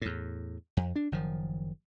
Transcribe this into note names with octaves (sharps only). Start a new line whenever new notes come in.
E2 A2
F2
D4
F#1 D#3 F3